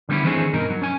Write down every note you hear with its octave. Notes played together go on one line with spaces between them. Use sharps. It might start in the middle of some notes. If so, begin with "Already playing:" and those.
D3 G3 B3 C#4 E4
D#3 E3 A3 C4 D4 G#4
G2 B2 D#4 A#4
F#3
C#4 G#5